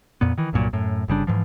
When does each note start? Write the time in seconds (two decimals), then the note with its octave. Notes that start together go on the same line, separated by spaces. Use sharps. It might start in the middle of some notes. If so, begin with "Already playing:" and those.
0.21 F2 A#2 B3
0.38 D#3 E3
0.53 C2 G2 A#2 F#3
0.73 F#2 A2
1.08 G1 C#3 G3 D4
1.27 G#2 E3 F3